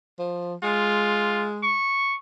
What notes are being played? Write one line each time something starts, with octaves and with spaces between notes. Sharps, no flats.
F3
G#3 F4
C#6